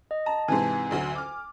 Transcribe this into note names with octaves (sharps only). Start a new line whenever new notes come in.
D#5
A5 A#5
G#2 C3 E3 G#5
A1 D2 F#3
D6 F6